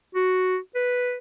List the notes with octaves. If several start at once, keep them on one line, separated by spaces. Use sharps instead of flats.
F#4
B4